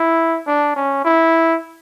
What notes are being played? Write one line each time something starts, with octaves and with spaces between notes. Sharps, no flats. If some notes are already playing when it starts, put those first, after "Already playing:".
Already playing: E4
D4
C#4
E4